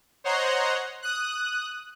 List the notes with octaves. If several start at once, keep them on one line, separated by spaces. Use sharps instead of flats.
C5 C#5 D#5 F#5 A#5 C6
D#6 F#6